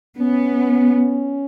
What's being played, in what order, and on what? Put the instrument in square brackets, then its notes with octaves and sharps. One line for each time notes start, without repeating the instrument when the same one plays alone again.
[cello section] B3 [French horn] C#4